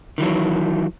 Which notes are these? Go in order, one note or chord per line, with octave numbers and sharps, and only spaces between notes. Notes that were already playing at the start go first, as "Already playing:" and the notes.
D#3 E3 F#3